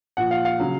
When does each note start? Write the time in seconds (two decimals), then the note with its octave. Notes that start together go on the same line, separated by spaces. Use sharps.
0.17 A#2 F3 F#5
0.31 F5
0.45 F5
0.60 C#3 F#3